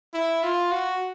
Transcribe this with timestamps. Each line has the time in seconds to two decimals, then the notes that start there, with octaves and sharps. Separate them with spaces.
0.14 E4
0.43 F4
0.71 F#4